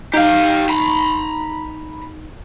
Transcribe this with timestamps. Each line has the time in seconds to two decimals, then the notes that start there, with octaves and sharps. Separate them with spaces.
0.14 D#4 G4 F5
0.69 A#5 B5